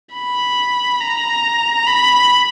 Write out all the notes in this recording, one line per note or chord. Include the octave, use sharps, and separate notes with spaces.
B5
A#5
B5